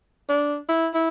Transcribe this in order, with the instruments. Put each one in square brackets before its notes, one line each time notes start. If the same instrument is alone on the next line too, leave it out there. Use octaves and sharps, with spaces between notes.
[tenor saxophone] D4
E4
E4